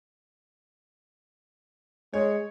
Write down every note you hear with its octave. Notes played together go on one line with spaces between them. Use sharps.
G#3 C#5